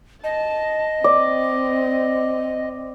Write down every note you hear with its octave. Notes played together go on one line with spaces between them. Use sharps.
D#5 A5
C4 D5